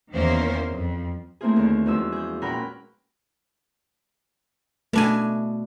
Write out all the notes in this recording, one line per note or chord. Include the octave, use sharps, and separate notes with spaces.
E2 D#3 A#3 C#4 A#4 C5
F2
A3 A#3 C4 E4 F4 G#4
D#2 D3
E2 F3 G#3 C#4 F#4 E6
G#4 G6
A#2 C#4 A#4 F#5 G5 B5
B2 A3 D4 G#5